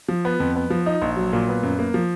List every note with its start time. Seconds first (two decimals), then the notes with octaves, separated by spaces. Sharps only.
0.08 F3
0.25 B3
0.40 F2
0.56 B3
0.70 F3
0.86 D#4
1.02 A#1
1.16 F#3
1.33 A#2
1.49 B3
1.63 F#2
1.79 A#3
1.94 F3